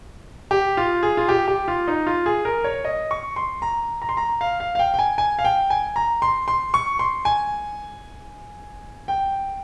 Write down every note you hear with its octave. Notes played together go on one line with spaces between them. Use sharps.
G4
F4
G#4
F4
G4
G4
F4
D#4
F4
G#4
A#4
C#5
D#5
C#6
C6
A#5
A#5
C6
A#5
F5
F5
F5
G5
G5
G#5
G#5
F5
G5
G#5
A#5
C6
C6
C#6
C6
G#5
G5